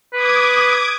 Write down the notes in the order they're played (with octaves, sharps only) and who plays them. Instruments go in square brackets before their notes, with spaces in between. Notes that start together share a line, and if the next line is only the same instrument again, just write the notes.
[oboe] B4 [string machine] D6 D#6 G#6